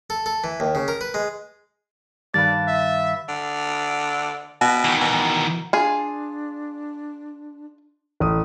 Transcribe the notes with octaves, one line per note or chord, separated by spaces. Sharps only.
A4
A4
E3
D#2
C#3
A#4
B4
G#3
G2 D#3 G3 B4 D5 F5 A5 A6
E5
D3
B2
D#3 E3
B2
D4 F4 G#4
A1 D#6